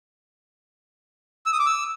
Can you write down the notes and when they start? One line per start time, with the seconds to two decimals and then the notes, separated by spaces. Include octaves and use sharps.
1.46 E6
1.53 D#6
1.59 D6
1.66 E6